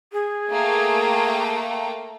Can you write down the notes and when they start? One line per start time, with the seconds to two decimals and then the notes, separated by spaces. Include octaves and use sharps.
0.13 G#4
0.51 A3 A#3 G5